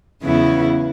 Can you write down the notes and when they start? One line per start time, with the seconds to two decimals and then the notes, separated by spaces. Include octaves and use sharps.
0.22 E2 C#3 F#3 B3 E4